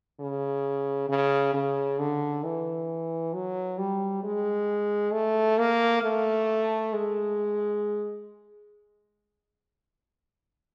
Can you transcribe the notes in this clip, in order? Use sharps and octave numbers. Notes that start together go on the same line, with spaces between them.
C#3
C#3
C#3
D3
E3
F#3
G3
G#3
A3
A#3
A3
G#3